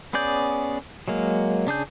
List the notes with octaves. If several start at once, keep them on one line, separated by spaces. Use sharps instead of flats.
B3 C#4 G#4 D5 G6
F#3 G#3 A#3
C#3 D4 G#4 G6